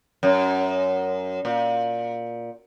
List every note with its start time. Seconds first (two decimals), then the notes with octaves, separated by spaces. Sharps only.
0.23 F#2
1.45 A#2